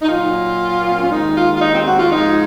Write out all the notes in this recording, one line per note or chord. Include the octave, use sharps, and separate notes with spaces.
D#4
A#2 F#3 F4
A#3
C4
C#4
D#2 D#3 G#3 D#4
F4
F4
D#4
C4
F#4
F4
G#2 F3 G#3 D#4